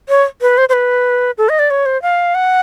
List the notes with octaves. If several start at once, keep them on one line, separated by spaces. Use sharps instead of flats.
C#5
B4
C5
C5
B4
A4
D#5
D5
C#5
C5
F5
F#5